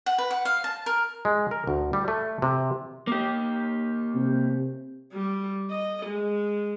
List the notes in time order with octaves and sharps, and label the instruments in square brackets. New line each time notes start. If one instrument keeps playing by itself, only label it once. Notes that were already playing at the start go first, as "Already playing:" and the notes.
[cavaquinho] F#5
B4
F#5
F5
A5
A#4
[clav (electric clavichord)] G#3
A#4
D2
G3
A3
C3
[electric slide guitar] A#3 G4
[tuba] C3
[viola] G3
D#5
G#3